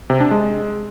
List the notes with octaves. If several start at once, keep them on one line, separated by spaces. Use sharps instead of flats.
C3
D4
G#3